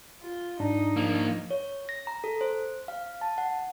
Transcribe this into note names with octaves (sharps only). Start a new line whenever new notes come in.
F4
G#2 D4 D#4
F3 A#3
C#5
A#6
A#5
A4
C5
F5
A5
F#5